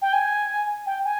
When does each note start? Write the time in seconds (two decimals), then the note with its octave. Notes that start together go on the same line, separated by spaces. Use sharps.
0.02 G5
0.13 G#5
0.86 G5
1.05 G#5